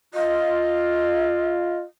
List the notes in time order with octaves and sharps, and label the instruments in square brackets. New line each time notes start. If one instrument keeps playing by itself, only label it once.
[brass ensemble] F4 [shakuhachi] D#5